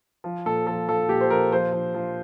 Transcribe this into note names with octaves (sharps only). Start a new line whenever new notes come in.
F3
A#2 A4
F3 A4
F3 A4
A#2 G4
C5
F3 A#4
F3 C5
F3
F3